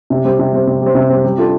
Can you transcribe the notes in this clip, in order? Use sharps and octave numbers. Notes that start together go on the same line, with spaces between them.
C3
G3 C4
C3
G3 C4
C3
G3
C4
C3
G3 C4
G3
D4 F4 A4